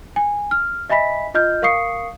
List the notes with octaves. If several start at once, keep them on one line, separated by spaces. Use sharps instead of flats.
G#5
F6
D#5 E5 G#5 B5 B6
F4 D#5 F6 G6
A#4 F5 C#6 D#6 C7 C#7